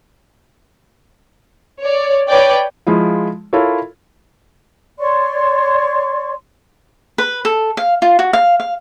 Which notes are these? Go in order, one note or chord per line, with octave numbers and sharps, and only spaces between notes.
C#5 D5
B4 C#5 D5 G5
F3 G#3 E4 F4
E4 F4 A4 A#4 C#5
C#5 D5 C6 C#6
B4
A4
F5
F4
F#4
F5
F5